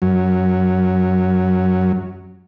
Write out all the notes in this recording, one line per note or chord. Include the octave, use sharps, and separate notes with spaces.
F#2 F#3